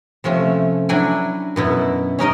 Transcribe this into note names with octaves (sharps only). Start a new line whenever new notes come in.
C3 F3 A3 C#4
F#3 D4 E4 G5 G#5
F#2 B2 E4
C#4 D#4 A#4 D#5